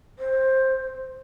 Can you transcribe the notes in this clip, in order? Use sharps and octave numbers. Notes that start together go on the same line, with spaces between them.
C5